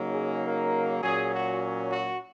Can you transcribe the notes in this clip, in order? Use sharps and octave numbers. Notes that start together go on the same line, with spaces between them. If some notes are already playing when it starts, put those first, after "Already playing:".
Already playing: C#3 F#3 A#3 D#4
G#4
A#4
A#2 F#3 C#4 G#4
F#4
F#4